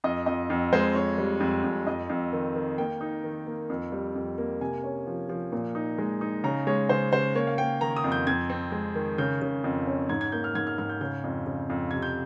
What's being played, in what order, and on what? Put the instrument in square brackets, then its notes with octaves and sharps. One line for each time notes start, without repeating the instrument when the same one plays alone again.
[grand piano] F2 D#5
F2 D#5
F2
G#3 C5
F2 C#5
G3
F2
F2
F2 D#5
F2
D#3
D#3
A#3 G5
D#4
D#3
A#3
F2
G3
F2
A#3
C3 G#5
C#4
F3
F3
A#2
D#4
G#3
D#4
C#3 A#5
G#3 C#5
C#3 C5
C#3 C5
A#3 C#5
F5
A#3 G5
D#3 A#5
D#6
F2
G6
F2 G#6
C4
G#3
D#3
C#3 G6
C#3
F2
C#4
G#2 G#6
G#6
A#3 G6
F6
G#2 G#6
F6
G#2 F6
G6
C#3 G6
F2
C#3
F2
C3 G#6
G6